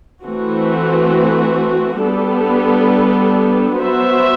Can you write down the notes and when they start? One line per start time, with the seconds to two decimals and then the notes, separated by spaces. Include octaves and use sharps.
0.23 E3 A3 C4 F#4
2.01 G3 B3 D4 A4
3.79 F#3 B3 F#4 C5 E5